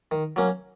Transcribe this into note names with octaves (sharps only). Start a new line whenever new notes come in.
D#3
F#3 A#3 C#4